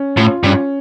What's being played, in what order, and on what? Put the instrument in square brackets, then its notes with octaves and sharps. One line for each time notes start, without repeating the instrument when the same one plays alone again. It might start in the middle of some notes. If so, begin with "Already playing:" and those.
Already playing: [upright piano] C#4
[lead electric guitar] A2 [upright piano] F4
[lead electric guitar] G2 [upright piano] C#4